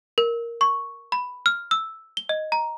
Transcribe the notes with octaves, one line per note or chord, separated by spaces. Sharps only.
A#4
C#6
B5
F6
E6
G7
D#5
A#5